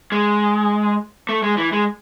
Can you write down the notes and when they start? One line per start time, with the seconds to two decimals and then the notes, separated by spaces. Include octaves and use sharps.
0.12 G#3
1.29 A3
1.43 G#3
1.58 E3
1.73 G#3